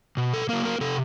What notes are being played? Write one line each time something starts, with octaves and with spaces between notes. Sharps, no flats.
B2
A4
F#3 A#3 A#4
A#4
C3 A4